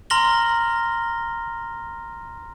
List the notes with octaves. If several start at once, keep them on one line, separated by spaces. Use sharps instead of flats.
A#5 C6 F6 A#6 F#7 G7